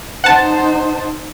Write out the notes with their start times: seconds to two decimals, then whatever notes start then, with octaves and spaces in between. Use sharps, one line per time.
0.24 D#4 C5 F#5 A5